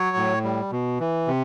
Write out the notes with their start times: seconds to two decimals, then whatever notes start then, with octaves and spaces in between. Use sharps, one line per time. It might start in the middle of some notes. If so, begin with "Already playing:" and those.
Already playing: F#3 C#5
0.17 A2
0.44 G3
0.72 B2
1.00 E3
1.27 C3